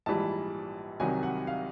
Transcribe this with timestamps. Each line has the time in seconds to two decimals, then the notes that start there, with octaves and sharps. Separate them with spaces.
0.06 A#1 G#2 E3 G3 A5
1.00 C2 C3 D#3 F#3 G#5
1.23 F#5
1.47 F5